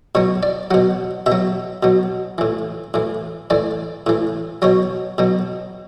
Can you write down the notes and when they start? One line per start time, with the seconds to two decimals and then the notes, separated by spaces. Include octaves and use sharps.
0.15 B2 F#3 C#5
0.43 D5
0.71 B2 F#3 F#5
1.26 B2 E5
1.32 F#3
1.83 B2 F#3
2.38 A2 E3
2.94 A2 E3
3.50 A2 E3 D5
4.07 A2 E3
4.62 B2 F#3 C#5
5.18 B2 F#3